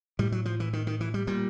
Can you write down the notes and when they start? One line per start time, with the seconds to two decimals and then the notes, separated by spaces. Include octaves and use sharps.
0.19 A2 G3
0.32 F#3
0.45 F3
0.60 E3
0.73 D#3
0.87 D#3
1.01 E3
1.14 G3
1.27 A#2 G3